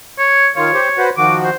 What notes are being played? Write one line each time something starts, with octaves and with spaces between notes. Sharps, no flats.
C#5
D#3 F4 C#5
G4 C5
F#4 B4 C5
D#3 F3 F#4 D6
C5